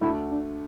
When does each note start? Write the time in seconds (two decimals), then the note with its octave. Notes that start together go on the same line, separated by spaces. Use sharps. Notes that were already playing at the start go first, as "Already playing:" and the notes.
0.01 D2 D3 A3 E4
0.31 D4